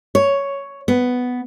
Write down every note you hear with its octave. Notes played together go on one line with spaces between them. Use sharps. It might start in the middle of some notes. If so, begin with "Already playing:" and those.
C#5
B3